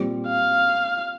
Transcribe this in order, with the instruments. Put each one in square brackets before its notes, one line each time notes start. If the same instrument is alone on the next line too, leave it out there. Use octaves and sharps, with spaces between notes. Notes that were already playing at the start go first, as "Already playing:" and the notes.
Already playing: [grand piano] A#2 G3 C4
[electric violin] F5